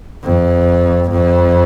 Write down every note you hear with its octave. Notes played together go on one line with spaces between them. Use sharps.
F2
F2